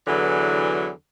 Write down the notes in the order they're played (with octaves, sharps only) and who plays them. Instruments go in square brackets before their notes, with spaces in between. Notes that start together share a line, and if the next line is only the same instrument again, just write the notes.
[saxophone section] E2 D3 E3 F#3